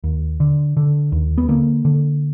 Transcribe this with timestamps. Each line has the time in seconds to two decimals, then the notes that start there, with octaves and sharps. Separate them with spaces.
0.04 D#2
0.40 D3
0.77 D3
1.12 D#2
1.38 B3
1.48 D3 A#3
1.85 D3